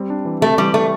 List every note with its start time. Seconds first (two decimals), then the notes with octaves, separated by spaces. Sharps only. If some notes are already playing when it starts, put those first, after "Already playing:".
Already playing: G3 C4
0.10 D4
0.25 E3
0.41 C3 A3
0.58 E3 G3
0.74 G3 A3